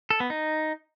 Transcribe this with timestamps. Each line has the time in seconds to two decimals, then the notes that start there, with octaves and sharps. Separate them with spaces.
0.10 A4
0.20 B3
0.30 D#4